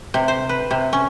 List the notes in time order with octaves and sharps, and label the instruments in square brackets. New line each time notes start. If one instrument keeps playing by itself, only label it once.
[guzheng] C3
C5
B4
C3
C#4